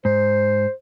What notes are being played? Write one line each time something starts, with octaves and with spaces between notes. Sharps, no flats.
G#2 C5